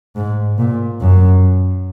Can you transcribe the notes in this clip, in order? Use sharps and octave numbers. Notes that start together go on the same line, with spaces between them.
G#2
A#2
F#2